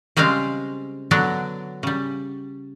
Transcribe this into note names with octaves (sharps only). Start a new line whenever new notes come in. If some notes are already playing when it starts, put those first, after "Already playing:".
C#3 G3 G#3 C4 F5
D3 F#3 B3 D4
C#3 G3